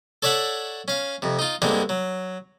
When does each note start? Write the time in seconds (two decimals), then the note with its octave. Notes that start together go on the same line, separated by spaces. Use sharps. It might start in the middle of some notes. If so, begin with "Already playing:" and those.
0.22 A4 C#5 D5 E5 F#5
0.88 C#4 F5
1.22 F2 C3
1.39 D#4 F4
1.62 G2 D3 G#3 A#3 C4
1.89 F#3